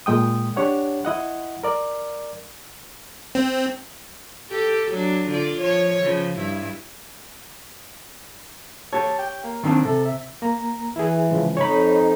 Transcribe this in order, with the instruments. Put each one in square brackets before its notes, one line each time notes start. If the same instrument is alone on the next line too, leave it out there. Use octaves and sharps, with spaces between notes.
[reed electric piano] A#2 G#3 G5 D#6
D4 G4 C#5 F#5
E4 D#5 F#5
A#4 D5
[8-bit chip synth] C4
[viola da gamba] G4 A4
F#3 D4
D3 F4 D5
F3 C#5
C#3 F3
G2 E4
[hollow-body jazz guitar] G4 C#5 [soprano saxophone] A5
[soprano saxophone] G5
A#3
[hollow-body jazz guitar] D#3 C4 D4
[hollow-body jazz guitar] C3 [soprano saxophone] A4
[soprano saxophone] E5
[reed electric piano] A#3 A#5
[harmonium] E3 [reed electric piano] E4 G#4
[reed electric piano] C#3 F3 G#3
[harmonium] F2 D#4 [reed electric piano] C#5 B5